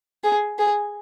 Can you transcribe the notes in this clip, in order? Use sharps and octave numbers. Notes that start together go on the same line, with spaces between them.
G#4
G#4